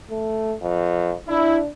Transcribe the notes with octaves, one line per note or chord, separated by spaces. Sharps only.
A3
F2
D4 E4